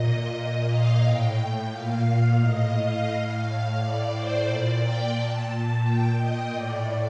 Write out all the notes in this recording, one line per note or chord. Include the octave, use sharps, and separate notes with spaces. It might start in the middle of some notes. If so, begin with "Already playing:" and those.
Already playing: A#2 D#5
A#2
F5
A2 G5
G5
A#2 F5
A2 D#5
F5
A2
A2 D5
C5
A#2 D5
G5
A#2 A5
A#2 G5
D#5
A2 D5